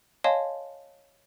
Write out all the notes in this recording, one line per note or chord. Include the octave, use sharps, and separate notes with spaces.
C#5 D#5 F5 G#5 A5 C6